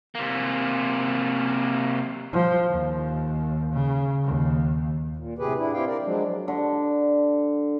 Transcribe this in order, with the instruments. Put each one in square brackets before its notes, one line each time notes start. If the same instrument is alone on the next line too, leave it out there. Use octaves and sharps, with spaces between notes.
[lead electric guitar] C3 A#3
[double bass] F3
D#2
C#3
D#2
[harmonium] A#2
A2 C3 G4 G#4 B4
D4 E4
C4 E4 G4 F5 G5
A#4 D5
F3 F#3 G#3 D4
[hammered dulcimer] D3